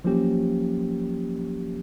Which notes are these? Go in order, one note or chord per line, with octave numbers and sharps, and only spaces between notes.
F3 F#3 A#3 C#4 G4